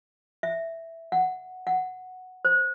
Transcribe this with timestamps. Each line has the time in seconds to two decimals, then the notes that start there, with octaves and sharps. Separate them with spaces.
0.43 E5
1.12 F#5
1.67 F#5
2.45 C5